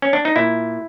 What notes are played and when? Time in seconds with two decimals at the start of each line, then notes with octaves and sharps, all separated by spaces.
0.02 C#4
0.13 D4
0.25 D#4
0.36 A#2 E4